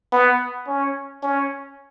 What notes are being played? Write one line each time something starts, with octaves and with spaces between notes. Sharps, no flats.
B3
C#4
C#4